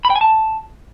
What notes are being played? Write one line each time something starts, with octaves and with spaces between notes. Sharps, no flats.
B5
G5
G#5
A5